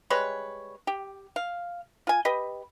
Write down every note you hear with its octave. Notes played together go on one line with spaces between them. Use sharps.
G3 G#3 B4 C#5
G4
F5
F4 G#5
G4 B4 D#5